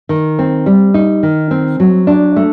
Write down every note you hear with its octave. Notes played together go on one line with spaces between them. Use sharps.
D#3
C4
G3
D#4
D#3
C4
F#3
D4
A3